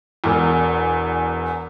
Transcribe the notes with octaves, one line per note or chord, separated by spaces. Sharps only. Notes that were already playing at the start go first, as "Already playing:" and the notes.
E1 E2